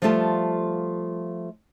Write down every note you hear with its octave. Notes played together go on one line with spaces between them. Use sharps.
F3 G3 A3 F4 A4 A5